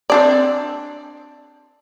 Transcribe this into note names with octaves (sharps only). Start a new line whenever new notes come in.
C4 D4 D5